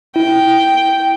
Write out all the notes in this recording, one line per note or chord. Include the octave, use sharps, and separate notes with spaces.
E4 G5